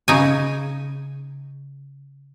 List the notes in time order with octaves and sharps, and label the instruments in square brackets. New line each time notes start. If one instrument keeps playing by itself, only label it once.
[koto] C#3 D#4 G#5